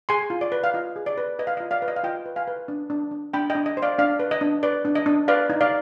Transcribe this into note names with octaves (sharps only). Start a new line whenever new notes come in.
G#4 G#5 C6
F4
D5
B4
F5
F4 D#5
G#4
D5
B4
B4 D#5
F5
F4 D#5
D5 F5
B4
D#5
F5
F4 D#5 G5
B4
F5 G#5
B4
D4
D4
D4
D4 G5 B5
D#5 G5
D4
D#5
C5
D5 F5
D4 D5 F5
B4
D#5
D4
B4 D5
D4
D#5
D4
B4 D5 F5
D#4
D5 F5